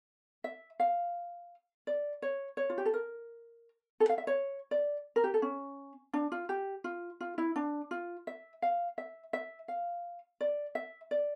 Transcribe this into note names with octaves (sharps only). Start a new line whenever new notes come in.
E5
F5
D5
C#5
C#5
F4
G4
A4
A#4
A4
F5
E5
C#5
D5
A#4
G4
A4
C#4
D4
F4
G4
F4
F4
E4
D4
F4
E5
F5
E5
E5
F5
D5
E5
D5